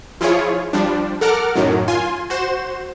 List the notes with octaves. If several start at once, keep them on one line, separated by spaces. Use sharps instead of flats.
F3 E4 F4 G#4 C#5
F3 G3 D4
A4 A#4 F#5 D6 F6
F#2 A2 D#3 F#3
F4 G#5 C6
F#4 C5 E7